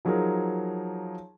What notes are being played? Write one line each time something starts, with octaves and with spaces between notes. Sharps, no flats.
F3 F#3 D#4 G#4 A#4